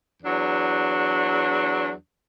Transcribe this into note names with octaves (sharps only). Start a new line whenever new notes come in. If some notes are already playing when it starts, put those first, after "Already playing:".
E2 F#3 D4